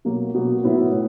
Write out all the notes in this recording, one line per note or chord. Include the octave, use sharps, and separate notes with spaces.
B2 F#3 A#3
B2 F#3 A#3
A2 F#3 B3 E4
A2